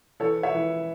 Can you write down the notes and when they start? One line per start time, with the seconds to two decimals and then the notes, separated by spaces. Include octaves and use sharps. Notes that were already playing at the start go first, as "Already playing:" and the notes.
0.20 E3 A4 C#5
0.43 C#5 E5
0.54 E3